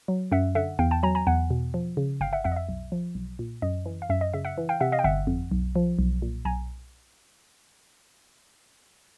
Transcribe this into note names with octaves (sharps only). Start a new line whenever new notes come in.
F#3
F#2 E5 F#5
D3 E5 F#5
E2 F5 G5
G5 A5
F#3 G#5 A#5
G#5 A#5
E2 F#5 G#5
B2
F3
C#3
G1 F5 G5
E5 F#5
F2 E5 F#5
D#5
E5
B1
F3
B1
A#2
F#2 D#5
E3
F5
F#2 E5
D#5
C#3 E5
E5 F#5
E3
F5 G5
C3 E5 F#5
D#5 F5
G5
G1 E5 F#5
F2
B1
F3
B1
A#2
B1 G#5 A#5